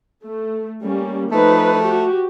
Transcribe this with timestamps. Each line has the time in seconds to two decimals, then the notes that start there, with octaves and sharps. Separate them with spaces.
0.24 A3
0.85 G3 A#3 C#4
1.32 F3 A3 D#4 B4
1.83 F#4 G4